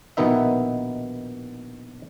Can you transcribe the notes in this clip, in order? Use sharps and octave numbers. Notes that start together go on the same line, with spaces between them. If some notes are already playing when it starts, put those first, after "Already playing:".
A#1 B2 D#3 B3 D#4 E5